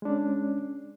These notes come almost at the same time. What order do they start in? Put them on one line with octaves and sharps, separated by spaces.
G#3 D4 C#4